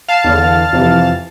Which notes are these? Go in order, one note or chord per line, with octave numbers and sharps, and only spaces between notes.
F5 A5
E2 D3
F2 C3 E3